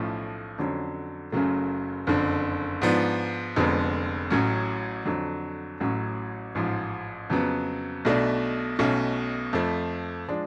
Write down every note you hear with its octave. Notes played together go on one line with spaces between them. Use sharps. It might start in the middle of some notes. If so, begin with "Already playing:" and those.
Already playing: B1 A2 F3 A3 C#4
F2 D3 F#3 C#4
F#1 F#2 C#3 F#3 A3
F#1 F2 D3
G#2 F3 B3 D4
F1 F2 D3 G#3 B3
A1 A2 F#3 C#4
F2 D3 F#3
A1 A2 F#3 C#4
A1 G#2 F3
F2 C#3 F#3 B3
B1 B2 A3 D4
B1 B2 A3 C#4
F2 F3 A3
F3 G#3 D4